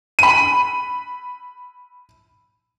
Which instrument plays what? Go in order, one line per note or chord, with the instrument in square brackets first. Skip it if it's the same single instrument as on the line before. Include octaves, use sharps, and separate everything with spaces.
[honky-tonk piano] B5 D#7